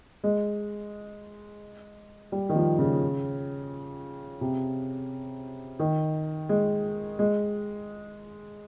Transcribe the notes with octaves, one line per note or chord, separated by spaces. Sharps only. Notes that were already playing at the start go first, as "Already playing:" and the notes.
G#3
G3
D#3
F3
C#3
C3
D#3
G#3
G#3